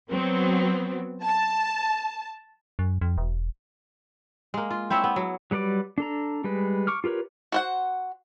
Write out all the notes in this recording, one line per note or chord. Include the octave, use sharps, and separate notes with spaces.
F#3 B3 C4
A5
F#2
F2
E1
G#3 A#3
F4
C4 E4 C#5 E5
B3
F#3
F#3 G3 B4 D5 D6
D4 A4 A#5
G3 G#3 B4
C#6 D6 F6
F4 G4 A#4 B4 C#5
F#4 C5 F#5